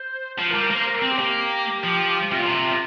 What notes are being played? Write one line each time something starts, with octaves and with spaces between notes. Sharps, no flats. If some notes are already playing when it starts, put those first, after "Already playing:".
Already playing: C5
F3 C5
A#4
G3
A#4
A#3 C5
A#4
C4
G4
A#3
F3
C3 F4
A#2
C3